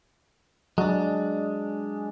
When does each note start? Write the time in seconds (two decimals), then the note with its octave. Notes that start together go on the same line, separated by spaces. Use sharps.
0.78 F#3 G#3 D4